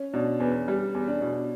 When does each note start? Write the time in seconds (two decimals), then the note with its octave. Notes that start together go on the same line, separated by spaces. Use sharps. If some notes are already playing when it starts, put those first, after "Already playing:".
Already playing: C#4
0.14 B2 D4
0.40 E2 B4
0.68 G3
0.95 E2
1.08 D4
1.21 B2